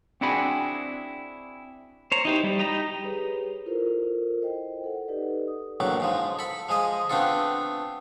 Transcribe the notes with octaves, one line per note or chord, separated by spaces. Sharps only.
C4 D4 E4 F#4 G#4 B5
C5 C#5 A#5
D#4 E4 G4 C5
G3
D#4 G4 A#5 B5
G4 G#4 B4 C#5
E4 F4 A4 A#4 C5
C5 D#5 G5
A4 F#5
D#4 G4 A4 B4 D5 D#5
D#6
A#1 E2 A2 F#3 D6
G#2 F3 G#3
A4 B5
F3 G#3 G#4 D#5
A3 B3 C4 D4 F4 A4